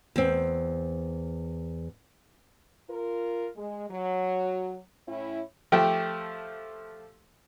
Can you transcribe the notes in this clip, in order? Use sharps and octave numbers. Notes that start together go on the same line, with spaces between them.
E2 C4
F4 A#4
G#3
F#3
A2 C#4 E4
F3 A3 G4 G5